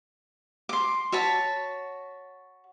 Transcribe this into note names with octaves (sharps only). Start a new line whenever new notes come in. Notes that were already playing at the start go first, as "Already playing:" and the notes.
C6 D6
F#4 C#5 A5 B5